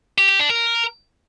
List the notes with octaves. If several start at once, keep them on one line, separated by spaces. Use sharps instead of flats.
G4
G4
D4
A#4